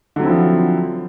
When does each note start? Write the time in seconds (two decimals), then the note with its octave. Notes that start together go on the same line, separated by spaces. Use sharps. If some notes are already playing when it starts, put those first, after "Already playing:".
0.16 D3
0.19 F#3
0.23 C4
0.26 E4
0.30 F3